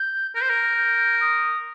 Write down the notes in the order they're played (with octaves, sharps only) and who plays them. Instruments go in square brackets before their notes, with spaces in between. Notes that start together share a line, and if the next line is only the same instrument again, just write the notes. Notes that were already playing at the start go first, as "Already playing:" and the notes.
Already playing: [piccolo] G6
[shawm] A#4 [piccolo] G6
[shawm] C5
A#4
[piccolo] G6
D#6